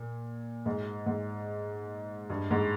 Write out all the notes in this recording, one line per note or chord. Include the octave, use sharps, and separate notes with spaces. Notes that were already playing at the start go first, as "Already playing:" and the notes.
Already playing: A#2
G#2
G#2
G2
G#2